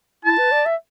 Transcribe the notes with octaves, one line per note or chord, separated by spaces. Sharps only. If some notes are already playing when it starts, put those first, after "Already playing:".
E4 A5
B4
D5
E5